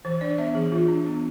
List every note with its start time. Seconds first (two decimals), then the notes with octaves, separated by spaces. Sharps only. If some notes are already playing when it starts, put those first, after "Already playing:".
0.05 E3 C5
0.21 D4 D5
0.38 B3 E5
0.55 E3 G#4
0.72 E3 F4
0.88 D4
1.05 B3